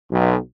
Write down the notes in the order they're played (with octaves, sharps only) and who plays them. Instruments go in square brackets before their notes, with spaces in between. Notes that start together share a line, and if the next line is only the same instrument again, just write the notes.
[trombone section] B1